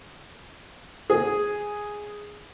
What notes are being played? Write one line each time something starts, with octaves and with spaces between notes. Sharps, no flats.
G#4